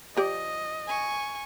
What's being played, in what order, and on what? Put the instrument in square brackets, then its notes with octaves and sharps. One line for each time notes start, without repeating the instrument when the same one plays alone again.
[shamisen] F3 G4 D5 [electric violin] D#5
[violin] G#5 C#6